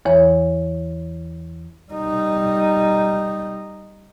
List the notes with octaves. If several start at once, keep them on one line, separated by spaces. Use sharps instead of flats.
E2 E3 C#5
G3 D#4